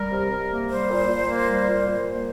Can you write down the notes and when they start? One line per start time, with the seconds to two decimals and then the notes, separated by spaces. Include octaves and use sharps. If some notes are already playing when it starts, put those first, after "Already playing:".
Already playing: G3 A#4
0.11 C3
0.30 C3
0.49 A#3
0.69 G3 C5
0.89 A#2
1.08 A#2
1.28 A#3
1.47 G3
1.67 A#2
1.87 A#2
2.06 A#3